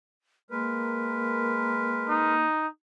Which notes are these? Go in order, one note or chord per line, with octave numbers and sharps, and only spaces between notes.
G#3 A#3 A#4 B4
D#4